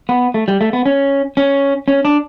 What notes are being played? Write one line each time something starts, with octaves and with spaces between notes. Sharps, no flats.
B3
A3
G3
A3
B3
C#4
C#4
C#4
D4